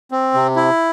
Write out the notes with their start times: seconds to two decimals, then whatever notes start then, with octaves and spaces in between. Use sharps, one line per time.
0.11 C4
0.34 C3
0.56 E4